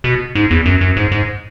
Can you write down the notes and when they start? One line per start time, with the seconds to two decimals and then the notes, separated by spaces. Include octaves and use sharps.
0.04 B2
0.35 G#2
0.51 E2
0.66 F#2
0.81 F#2
0.97 G#2
1.12 G#2